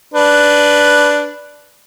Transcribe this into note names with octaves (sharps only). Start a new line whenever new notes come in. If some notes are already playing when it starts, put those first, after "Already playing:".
D4 B4